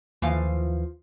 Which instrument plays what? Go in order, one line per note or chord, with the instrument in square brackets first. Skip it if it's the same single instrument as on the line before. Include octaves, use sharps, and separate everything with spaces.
[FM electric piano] D#2 [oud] E3 F3 F5